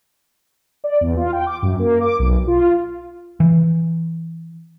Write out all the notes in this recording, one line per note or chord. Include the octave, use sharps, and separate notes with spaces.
D5
E2
F4
G5
D6
F#2
A#3
D6
B1
F4
E3